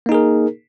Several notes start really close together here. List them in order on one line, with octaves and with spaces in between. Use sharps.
A#3 D#4 G#4 A#4